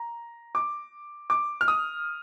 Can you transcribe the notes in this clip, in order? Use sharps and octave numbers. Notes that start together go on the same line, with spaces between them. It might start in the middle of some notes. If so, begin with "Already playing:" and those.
Already playing: A#5
D6
D6
F6
D#6